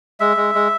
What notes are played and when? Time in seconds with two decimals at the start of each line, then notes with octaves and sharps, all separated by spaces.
0.20 G#3 E5
0.37 G#3
0.55 G#3